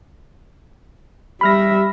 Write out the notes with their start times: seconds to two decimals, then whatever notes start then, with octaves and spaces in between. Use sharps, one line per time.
1.41 G3 E5 B5 F6 A#6